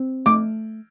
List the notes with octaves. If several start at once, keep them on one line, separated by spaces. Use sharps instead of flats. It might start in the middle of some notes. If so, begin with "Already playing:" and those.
Already playing: C4
A3 D6